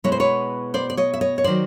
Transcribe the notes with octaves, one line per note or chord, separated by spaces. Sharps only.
B2 G#3 B3 E4 C#5
C5
B4 C#5
C5 D5
D5
C#5 D#5
E5
C#5 D#5
C#5
D#3 F#3 C5 D5